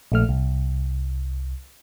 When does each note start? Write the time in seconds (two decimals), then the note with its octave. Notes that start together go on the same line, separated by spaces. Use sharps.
0.12 A#1 A3 F6
0.29 C2